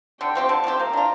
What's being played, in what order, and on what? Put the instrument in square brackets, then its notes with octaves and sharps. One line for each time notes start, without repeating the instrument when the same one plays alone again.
[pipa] D3 [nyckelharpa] G5
[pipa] F3 C4 G4
[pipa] D3 [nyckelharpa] A5
[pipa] F3 C4 G4
[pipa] A#3 [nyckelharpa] A#5
[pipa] D4 F4